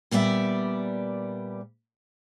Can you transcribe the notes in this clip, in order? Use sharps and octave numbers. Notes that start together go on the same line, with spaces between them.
A#2 G3 B3 D5 E5